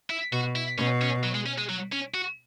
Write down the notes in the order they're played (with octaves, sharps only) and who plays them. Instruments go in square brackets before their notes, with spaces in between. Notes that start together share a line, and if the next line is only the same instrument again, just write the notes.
[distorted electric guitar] E4
[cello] B2 [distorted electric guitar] F#4
[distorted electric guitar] E4
[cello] B2 [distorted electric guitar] C#4
[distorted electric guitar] C#4
F#3
G#3
C#4
G#3
F#3
C#4
F#4